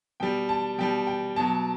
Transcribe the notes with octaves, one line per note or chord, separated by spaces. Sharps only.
B2 G3 G5
A5
B2 G3 G5
G5
B2 F#3 A5